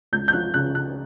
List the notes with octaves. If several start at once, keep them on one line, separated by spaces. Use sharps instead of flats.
C#2 G6
G6
F3 F#6
C#3 F#6
C#3 F#6